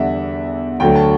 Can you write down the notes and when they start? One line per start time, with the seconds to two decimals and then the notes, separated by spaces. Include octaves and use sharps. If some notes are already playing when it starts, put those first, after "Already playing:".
Already playing: E2 D3 G3 E5 F#5
0.80 D2 D3 F#3 A3 G5
0.95 A5